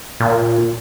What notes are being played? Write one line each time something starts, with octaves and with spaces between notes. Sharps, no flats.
A#2